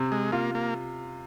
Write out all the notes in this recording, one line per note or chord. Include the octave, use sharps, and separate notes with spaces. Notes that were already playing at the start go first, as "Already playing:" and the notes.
Already playing: C3
G#3
A#3 F4
A#3